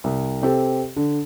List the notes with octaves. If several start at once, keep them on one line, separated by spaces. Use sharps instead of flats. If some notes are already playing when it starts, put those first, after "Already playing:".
C2
C3 C4 G4 A4
D3